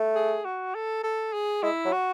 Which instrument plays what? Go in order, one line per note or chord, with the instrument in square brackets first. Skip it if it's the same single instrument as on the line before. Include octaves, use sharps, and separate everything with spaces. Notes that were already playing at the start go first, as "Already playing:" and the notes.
Already playing: [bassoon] A3
[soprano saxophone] G#4
F#4
A4
A4
G#4
[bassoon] G#3 [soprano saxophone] E4
[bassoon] F#3
[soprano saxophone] F#4